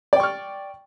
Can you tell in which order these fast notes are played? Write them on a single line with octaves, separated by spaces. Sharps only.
D5 G5 C#6 F6